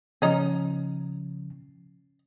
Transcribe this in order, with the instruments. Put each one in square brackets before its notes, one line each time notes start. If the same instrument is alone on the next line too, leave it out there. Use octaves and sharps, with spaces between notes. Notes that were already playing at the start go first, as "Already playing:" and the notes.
[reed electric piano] C#3 F3 [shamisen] C#4 D#4